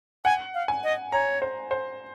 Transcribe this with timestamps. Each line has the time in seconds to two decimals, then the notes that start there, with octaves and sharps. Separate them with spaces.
0.25 F#5 G#5
0.54 F5
0.68 G#5
0.84 D#5
1.12 C#5 A#5
1.42 C5
1.71 C5